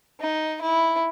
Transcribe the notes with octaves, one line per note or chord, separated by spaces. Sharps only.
D#4
E4